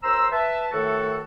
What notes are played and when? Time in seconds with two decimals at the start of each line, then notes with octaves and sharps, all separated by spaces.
0.03 D#2 C5 A#5 C6 E6
0.32 B4 E5 A5
0.72 A2 D#3 A3 F#4 A4